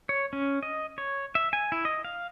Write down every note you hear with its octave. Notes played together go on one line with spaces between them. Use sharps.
C#5
C#4
D#5
C#5
E5
G#5
E4
D#5
F5